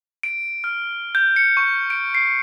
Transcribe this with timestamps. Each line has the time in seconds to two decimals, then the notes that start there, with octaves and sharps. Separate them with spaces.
0.23 D7
0.64 F6
1.15 G6
1.36 C#7
1.57 C#6
1.90 D7
2.14 C7